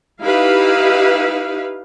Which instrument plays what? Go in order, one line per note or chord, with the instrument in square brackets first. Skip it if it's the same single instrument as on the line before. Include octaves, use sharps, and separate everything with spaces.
[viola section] D#4 E4 G4 B4 F5